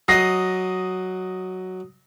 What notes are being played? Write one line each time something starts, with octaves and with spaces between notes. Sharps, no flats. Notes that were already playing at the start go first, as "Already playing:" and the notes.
F#3 D#5 D#6 A#6 C7